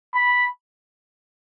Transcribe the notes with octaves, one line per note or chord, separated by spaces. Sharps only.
B5